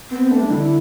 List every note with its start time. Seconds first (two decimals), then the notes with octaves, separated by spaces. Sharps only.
0.11 B3 C4
0.21 B3
0.31 A3 D4
0.41 G3
0.51 D3 E4